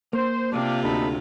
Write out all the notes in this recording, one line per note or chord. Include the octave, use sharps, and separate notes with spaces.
A#3 C5
C3 D4 F4 G4 F5
D2 D#4 A4 B5